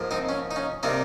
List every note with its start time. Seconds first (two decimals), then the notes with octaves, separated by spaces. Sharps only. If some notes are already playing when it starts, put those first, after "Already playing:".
Already playing: G#2 F3 A#3
0.11 C4 D#4
0.29 C#4
0.51 D#4
0.56 C#4
0.83 C3 G3 A#3 C4 D#4